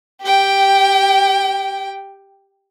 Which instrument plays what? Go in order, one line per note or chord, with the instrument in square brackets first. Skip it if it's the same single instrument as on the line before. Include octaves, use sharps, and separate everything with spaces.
[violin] G4 G5